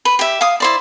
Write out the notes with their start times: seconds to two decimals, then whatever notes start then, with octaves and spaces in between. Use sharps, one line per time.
0.05 B4
0.19 G4 E5
0.41 F5 D#6
0.60 E4 C5 D5